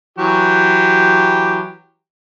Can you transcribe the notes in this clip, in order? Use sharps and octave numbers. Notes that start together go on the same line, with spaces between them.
E3 F#3 G4